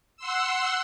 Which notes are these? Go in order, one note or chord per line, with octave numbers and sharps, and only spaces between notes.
F#5 C6 E6